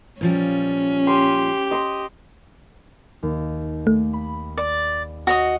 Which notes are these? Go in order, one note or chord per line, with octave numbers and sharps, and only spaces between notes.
A#2 F3 G3 C#4
G4 C6
D#5 C6
D#2
A3
B5
D5
F#4 C#5 D#5